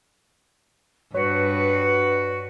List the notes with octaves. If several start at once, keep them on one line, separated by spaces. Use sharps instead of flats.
G2 F#4 B4 C#5